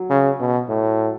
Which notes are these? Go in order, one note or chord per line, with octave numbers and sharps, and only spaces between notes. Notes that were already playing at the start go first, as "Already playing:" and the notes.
Already playing: F#3
C#3
B2
A2